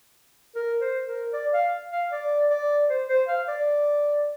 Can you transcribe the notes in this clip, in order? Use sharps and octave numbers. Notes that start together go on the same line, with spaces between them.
A#4
C5
A#4
D5
F5
F5
D5
D5
C5
C5
F5
D5